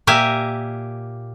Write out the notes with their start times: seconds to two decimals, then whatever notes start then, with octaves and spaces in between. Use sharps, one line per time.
0.07 A#2 A#3 G4 E5 G#5